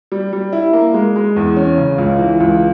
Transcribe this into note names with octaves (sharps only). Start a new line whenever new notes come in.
G3
G3
E4
A#3
G#3
G#3
E2
C#4
C#3
C#2
E3
C#2